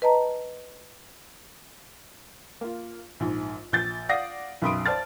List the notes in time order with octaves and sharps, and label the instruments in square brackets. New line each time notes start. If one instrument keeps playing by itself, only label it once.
[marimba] B4 D#5 A5 A#5
[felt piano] A#3 F4
A#1 G#2
A#1 G6 A6
D5 F5 F#5 D#6 A#6 C7
B1 F#2 B5 C6 D#6 D7
C5 D5 A5 F6 A6